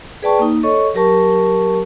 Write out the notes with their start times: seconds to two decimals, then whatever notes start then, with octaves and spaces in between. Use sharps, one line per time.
0.22 G#4 B4 D5 G5 A5 C#6
0.39 A#3 D#4
0.63 A4 C#5 D#5 C#6
0.94 F#3 G4 A#4 A5 C#6